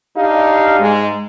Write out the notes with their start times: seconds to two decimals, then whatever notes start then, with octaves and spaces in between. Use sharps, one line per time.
0.17 D4 D#4 G4 F5
0.80 G#2 G#3